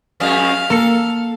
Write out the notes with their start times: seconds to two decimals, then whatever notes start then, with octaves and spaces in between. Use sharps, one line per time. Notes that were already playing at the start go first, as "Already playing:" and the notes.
0.20 F2 G#3 F5
0.70 A#3 A4 C#7